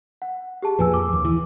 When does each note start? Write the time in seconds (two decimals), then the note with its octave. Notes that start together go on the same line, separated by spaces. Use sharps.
0.22 F#5
0.63 G4 G#4 A5
0.79 F2 A#2 F3 B4 G#5 E6
0.94 D6
1.13 D#2
1.25 E3